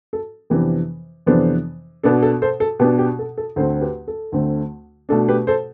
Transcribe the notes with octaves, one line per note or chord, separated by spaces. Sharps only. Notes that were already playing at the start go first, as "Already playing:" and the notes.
A4
F2 C3 E3 B3 D4 G4 B4
F2 C3 E3 B3 D4 A4 C5
B2 B3 D4 A4
A4
A4 C5
A4
B2 B3 D4 G4 B4
G4
A4
A4
D2 D3 A3 C4 A4 C5
G4 B4
A4
D2 D3 A3 C4
B2 A3 D4 A4
G4 B4
A4 C5